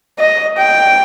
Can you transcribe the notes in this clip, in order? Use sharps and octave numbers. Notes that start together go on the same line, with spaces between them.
D#5
G5